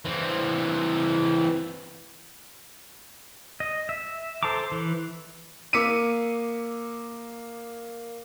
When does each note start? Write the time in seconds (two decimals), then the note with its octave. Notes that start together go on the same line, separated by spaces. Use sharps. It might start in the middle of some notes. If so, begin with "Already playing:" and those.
0.05 E3 C4
3.60 D#5
3.89 E5
4.43 A4 C5 A5 A#5 D6
4.72 E3
5.73 A#3 D6 E6 B6 C#7 D#7